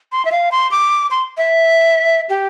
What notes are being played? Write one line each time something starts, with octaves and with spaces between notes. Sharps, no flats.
C6
E5
F5
C6
D6
C6
E5
G4